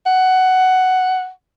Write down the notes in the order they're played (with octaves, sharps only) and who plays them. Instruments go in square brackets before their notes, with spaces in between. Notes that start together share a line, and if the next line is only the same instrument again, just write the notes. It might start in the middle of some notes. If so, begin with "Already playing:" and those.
[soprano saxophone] F#5